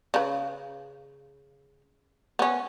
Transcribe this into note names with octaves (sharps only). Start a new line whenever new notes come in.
C#3 B4
B3 C#4